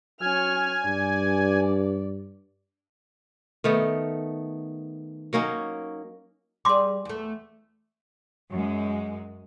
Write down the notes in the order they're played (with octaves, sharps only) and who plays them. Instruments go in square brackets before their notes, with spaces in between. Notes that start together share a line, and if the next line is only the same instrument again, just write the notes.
[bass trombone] F#3 [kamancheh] C#4 F6 [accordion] G#5
[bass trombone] G2 [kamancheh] D5
[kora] D#3 A3 B3
F#3 A#3 C#4 D#4
[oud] G3 G#4 [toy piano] C6 D6
[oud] E2 A3
[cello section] F#2 G#3